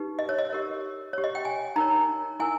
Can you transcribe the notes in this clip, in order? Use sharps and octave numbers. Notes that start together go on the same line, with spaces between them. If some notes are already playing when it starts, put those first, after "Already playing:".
Already playing: D#4 G4 B4
D#5
C#5
D#5
G4 A#4 C#5
G4 C#5
D#5
G5
G#5
D#4 A#4 C#5 A#5
E4 A#4 G#5